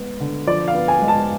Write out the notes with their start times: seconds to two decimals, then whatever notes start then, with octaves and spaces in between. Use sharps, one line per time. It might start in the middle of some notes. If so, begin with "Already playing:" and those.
Already playing: G#3 B3
0.20 D3
0.47 F3 D5
0.68 F5
0.75 B3
0.88 G#5
1.02 G#3
1.08 A5